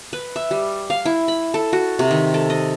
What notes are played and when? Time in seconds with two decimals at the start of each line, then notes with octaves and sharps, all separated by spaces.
0.13 B4
0.36 E5
0.51 G3
0.90 F5
1.06 E4
1.28 B5
1.54 A4
1.73 F#4
1.99 C3
2.11 D#3
2.34 A4
2.50 D#5